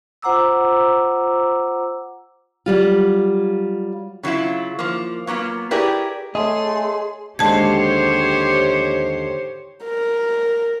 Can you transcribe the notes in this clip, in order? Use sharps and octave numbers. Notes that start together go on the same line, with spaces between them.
F4 C5 F#5 A#5 D6 E6
F#3 G3 F4
C#3 F#3 A#3 E4 F4
F3 A#3
F#3 A#3 B3 F4
E4 G4 G#4 A#4 B4 D5
A3 G#4 C#5 D#5 C6
D#2 D3 G#3 G4 C5 C#5 A5 G#6
A#4